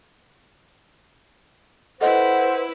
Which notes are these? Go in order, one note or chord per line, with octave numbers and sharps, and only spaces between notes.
E4 A4 B4 C5 D#5 F#5